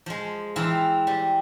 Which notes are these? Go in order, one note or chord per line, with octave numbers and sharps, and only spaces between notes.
F3 G#3
E3 C4 F5 A#5
G3